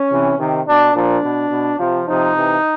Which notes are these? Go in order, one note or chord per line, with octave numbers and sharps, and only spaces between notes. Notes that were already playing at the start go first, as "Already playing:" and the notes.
Already playing: C#4
C3 E3
C3 D#3
B2 D4
A#2 F3 D4
B2
B2
C3 F3
C3 F3 D#4
C3 E3